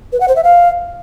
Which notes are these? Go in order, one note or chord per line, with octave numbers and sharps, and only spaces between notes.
B4
F#5
C5
E5
F5